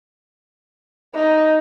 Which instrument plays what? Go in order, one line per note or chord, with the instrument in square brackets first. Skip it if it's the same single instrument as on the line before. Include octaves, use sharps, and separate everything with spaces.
[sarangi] D#4